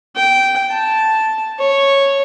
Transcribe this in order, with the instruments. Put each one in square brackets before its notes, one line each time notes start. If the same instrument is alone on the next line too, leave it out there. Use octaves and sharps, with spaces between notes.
[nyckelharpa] G5
A5
C#5